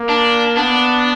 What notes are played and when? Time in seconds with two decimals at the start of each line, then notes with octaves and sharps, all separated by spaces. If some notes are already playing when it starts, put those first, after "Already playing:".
Already playing: A#3
0.09 D4
0.57 B3 D4